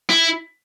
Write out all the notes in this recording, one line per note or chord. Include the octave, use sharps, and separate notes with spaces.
E4